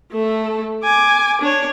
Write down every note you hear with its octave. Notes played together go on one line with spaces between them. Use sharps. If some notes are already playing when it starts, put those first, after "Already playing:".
A3 A4
G#5 D6
D4 C#5